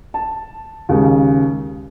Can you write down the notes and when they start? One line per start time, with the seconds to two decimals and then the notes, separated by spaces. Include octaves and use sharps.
0.14 A5
0.89 D#2 C#3 G#3